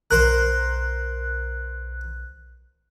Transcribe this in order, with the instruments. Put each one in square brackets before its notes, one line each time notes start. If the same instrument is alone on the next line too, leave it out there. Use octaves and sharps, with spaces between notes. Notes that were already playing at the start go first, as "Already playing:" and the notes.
[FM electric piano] B1 F#6 [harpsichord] A#4 C5